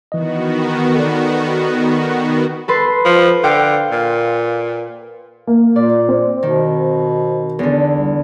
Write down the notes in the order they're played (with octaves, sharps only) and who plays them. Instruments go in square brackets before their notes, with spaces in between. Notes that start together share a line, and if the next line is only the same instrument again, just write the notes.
[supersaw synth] D#3 B3 F#4 [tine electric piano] E3 D#5
[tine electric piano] A4 D5
[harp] A4 B4 C6
[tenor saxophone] F3
[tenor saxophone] D3 [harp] C5 F5 G5
[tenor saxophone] A#2
[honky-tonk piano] A#3
[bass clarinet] A#2 [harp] D5
[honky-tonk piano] C4
[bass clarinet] B2 [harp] D#3
[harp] E2 D3
[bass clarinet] C2